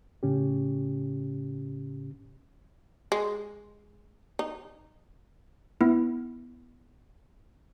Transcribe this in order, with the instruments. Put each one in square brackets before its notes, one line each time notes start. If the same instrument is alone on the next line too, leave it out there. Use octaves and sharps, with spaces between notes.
[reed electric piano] A2 C#3 C#4 G4
[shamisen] G#3
D#4
[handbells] B3 E4